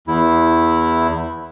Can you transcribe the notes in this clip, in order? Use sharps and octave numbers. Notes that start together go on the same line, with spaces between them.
E2 E4